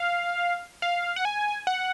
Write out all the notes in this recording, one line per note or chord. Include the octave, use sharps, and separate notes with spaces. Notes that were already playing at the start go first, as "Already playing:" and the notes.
Already playing: F5
F5
F#5
G#5
F#5